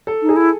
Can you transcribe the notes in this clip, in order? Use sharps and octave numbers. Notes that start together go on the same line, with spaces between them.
A4
D#4
G#4
E4